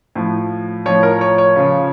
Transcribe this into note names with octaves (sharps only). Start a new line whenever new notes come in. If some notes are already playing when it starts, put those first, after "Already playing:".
A2 F3
A2 F3 C#5
A#4
C#5
C#5
C#3 F3